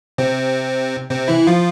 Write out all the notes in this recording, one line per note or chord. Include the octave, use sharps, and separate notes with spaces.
C3 C4
C3 C4
E3 E4
F3 F4